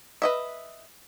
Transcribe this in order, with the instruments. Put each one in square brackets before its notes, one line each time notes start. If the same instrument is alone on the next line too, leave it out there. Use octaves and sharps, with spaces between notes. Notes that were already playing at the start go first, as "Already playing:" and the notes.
[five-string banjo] B4 D#5 E5